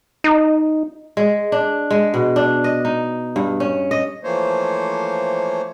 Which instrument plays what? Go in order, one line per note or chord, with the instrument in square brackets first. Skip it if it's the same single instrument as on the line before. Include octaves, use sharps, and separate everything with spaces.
[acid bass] D#4
[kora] G#3
D4
G#3
B2
D4
D#5
D#4
G2
C#4
D#5
[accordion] E3 F3 A3 A#3 C5 C#5